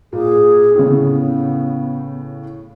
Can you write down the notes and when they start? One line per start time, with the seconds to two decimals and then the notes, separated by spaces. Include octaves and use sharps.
0.13 A#2 G#4
0.75 A2 C#3 B3